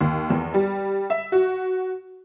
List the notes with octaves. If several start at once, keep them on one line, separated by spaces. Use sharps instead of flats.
D#2
E2
G3
E5
F#4